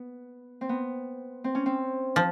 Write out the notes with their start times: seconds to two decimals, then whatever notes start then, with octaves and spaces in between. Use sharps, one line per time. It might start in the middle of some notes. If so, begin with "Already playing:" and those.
Already playing: B3
0.61 C4
0.69 B3
1.44 C4
1.55 C#4
1.66 C4
2.16 F3